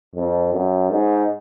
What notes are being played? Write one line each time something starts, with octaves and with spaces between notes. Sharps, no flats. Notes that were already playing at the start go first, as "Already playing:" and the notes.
F2
F#2
G#2